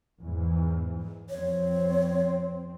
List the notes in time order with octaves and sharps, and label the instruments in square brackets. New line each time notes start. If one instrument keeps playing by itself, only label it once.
[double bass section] E2 G#2 E3
[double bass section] F2 C4 [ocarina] C#5